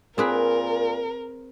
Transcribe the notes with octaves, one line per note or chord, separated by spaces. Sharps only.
A#2 C4 G#4 A#4 B4